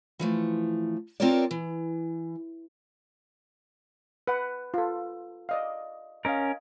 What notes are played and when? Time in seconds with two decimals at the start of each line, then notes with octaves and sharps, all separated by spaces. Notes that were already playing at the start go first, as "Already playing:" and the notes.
0.19 E3 F3 A3
1.20 C4 F4 A4 A#4 C#5 D5
1.51 E3
4.27 B4 F#5
4.74 F4 A4
5.49 D5 D#5 F5
6.25 C#4 A#4 D#5 F5